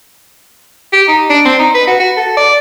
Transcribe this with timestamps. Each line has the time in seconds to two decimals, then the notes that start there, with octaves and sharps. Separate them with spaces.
0.93 G4
1.08 D#4
1.30 D4
1.45 C4
1.59 D#4
1.74 B4
1.87 F#4
2.00 F#4
2.17 A4
2.37 D5